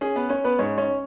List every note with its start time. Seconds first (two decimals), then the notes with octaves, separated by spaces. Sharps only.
0.01 C#4 G#4
0.16 B3 B4
0.29 C#4 C#5
0.44 B3 B4
0.59 G#2 C#4 C#5
0.78 C#4 C#5